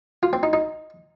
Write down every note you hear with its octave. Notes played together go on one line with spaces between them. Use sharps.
F4
C4
D#4
D#4